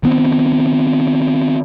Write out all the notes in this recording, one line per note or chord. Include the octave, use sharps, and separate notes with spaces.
D#3 B3 C4